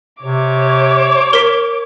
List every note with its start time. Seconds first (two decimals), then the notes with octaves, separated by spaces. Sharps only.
0.23 C3 C#5 D6
1.33 A#4 B6